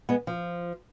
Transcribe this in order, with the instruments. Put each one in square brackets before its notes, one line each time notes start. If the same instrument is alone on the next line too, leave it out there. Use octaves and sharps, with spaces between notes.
[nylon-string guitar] G#3 B3
F3